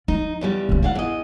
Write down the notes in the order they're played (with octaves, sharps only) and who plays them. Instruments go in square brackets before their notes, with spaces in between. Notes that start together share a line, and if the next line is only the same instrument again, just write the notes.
[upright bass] F3 [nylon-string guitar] D#4
[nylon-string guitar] E2 C#3 G3
[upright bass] C2 D4
[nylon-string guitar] G#2 F5 F#5 [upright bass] F4
[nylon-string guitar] E2 D#5